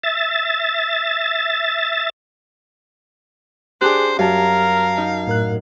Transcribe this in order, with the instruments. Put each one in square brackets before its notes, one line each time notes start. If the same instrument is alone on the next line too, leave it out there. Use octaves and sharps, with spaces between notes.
[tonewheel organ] E5 A6
[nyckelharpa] D4 [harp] G4 [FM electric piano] G#4 F#6 [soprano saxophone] C5
[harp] F#2 [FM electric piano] G4 A5 [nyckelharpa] A#4 [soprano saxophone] F5
[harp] D#4
[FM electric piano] A2 A#4 F#6